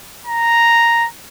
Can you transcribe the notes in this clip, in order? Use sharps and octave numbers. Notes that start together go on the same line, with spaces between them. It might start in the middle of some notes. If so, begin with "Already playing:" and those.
A#5